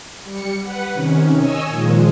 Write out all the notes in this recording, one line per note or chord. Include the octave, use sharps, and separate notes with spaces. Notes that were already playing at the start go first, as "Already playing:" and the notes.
G3 C#7
B4 F#5
C3 D#3 C#4
C#5 D#5 G#5 E6
A#2 D#3 F3 G#3